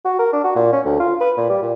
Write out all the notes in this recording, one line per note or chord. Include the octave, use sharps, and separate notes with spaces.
F#4
A#4
D4
F#4
A#2
C#4
D2
F4
B4
A#2
G3
A#2